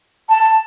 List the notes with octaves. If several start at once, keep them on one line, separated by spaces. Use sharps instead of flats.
A5